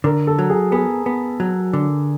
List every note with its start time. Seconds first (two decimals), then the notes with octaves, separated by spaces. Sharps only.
0.04 D3 A#4
0.27 A4
0.39 F#3
0.50 G#4
0.72 B3 G#4
1.06 B3
1.40 F#3
1.73 D3